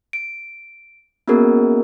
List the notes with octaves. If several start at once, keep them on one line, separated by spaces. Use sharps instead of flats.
D7
A#3 B3 C#4 F#4 G#4 A#4